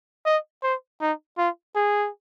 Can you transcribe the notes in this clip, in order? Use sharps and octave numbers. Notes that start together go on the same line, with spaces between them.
D#5
C5
D#4
F4
G#4